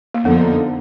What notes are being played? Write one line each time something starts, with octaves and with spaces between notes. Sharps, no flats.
A#3
F2 D3 F3 A#3 B3 D#4